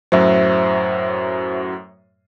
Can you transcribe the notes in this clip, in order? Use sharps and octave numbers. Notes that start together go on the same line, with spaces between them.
F#2 A2 F#3 C5 E5